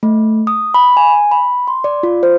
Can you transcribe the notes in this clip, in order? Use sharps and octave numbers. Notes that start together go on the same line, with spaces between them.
A3
D#6
B5
G#5
B5
C6
D5
F4
C5